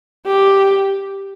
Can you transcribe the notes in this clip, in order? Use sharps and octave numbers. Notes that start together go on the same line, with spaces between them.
G4